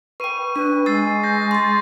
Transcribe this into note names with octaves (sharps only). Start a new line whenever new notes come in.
B4 G5 C#6 D#7
D4 B4
G#3 E6 A6 C7
G6 A#6
C6 A6